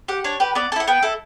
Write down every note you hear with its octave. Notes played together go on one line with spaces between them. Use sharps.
G4 F#5
D4 C#5
G4 B4
B3 D5
E4 A4 F#5 A5
B3 G5
E4 A4